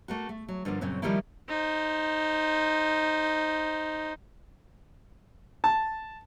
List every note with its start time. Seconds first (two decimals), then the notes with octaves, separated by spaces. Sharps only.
0.08 A3 A#3 F#4
0.29 A3
0.48 F#3
0.65 G2 D3 F3 A#3
0.81 F#2 A#2 C#3 A#3 C4
1.02 D#3 F3 G3 A3 A#3 E4
1.49 D#4 C5
5.64 A5